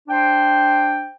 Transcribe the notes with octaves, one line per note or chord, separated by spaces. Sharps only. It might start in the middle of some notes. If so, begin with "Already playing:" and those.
D4 C5 G5